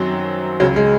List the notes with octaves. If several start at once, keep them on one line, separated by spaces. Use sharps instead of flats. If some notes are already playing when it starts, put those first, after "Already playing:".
Already playing: F#2 D#3 F#3 C4
C#2 C#3 F#3
G#3